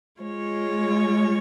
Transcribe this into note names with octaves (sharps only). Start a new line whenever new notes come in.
G#3 F4 C#5